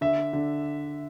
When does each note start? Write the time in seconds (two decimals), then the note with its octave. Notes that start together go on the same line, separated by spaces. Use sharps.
0.01 D3 E5
0.33 D3